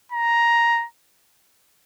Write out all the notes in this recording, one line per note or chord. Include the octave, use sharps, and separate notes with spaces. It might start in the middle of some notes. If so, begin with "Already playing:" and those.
A#5